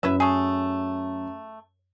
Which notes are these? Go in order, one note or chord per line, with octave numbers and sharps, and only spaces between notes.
F#2 E4 B4 E5
A3 G#4